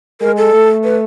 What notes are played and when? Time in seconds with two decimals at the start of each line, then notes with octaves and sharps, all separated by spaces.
0.21 G#3 A#4
0.37 A4
0.53 A3
0.84 B4